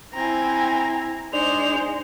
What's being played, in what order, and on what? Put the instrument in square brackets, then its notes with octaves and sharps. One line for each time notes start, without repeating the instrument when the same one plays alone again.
[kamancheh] C4 G#5 [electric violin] E4 A#5
[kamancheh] G#3 [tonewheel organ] D4 D#4 D5 [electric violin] C5 [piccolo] F7